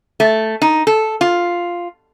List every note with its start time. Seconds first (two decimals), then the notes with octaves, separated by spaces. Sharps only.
0.20 A3
0.62 D#4
0.87 A4
1.21 F4